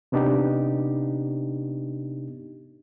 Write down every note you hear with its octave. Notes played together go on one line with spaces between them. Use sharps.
C3 B3 D4 D#4 G4